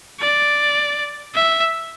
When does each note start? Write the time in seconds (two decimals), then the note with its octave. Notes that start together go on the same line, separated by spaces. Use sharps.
0.20 D5
1.35 E5